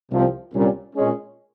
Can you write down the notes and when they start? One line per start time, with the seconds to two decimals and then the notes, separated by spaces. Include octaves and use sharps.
0.10 C2 C3 F3 C4
0.53 C2 A#2 G3 C#4
0.96 A#2 G#3 C#4